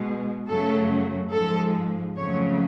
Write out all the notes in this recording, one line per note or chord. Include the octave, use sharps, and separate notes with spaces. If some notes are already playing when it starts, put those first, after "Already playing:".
Already playing: B2 G#3
F#2 C#3 F#3 A3 A4
G#2 F3 G#3 A4
F2 C#3 F#3 A3 C#5